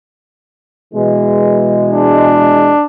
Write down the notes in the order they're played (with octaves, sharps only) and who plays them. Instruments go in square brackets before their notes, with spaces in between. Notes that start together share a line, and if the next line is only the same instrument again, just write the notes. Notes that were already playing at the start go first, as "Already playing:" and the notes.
[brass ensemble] B2 E3 G#3
[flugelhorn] D4